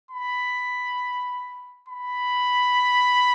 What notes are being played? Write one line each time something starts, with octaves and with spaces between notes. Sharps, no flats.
B5
B5